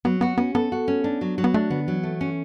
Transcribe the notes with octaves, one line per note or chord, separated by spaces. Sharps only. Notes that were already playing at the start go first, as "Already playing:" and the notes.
F#3 B3
B3 F#4
B3 C#4
B3 A4
F#4
C#4
D4
F#3
F#3
B3
A3 D4
D3 B3
E3 F#3
A3
C#4